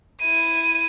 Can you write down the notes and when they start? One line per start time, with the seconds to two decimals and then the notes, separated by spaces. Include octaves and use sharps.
0.21 E4 D#7